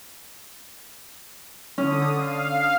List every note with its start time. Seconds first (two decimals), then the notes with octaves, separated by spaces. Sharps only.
1.78 D3 C#4 D#6
2.17 F5